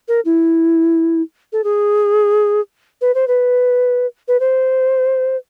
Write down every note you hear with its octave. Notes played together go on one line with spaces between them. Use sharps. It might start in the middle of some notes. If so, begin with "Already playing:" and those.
A#4
E4
A4
G#4
B4
C5
B4
B4
C5